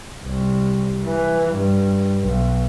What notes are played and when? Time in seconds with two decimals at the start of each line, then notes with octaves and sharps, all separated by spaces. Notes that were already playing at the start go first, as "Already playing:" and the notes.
0.23 C2
1.05 E3
1.52 G2
2.22 B1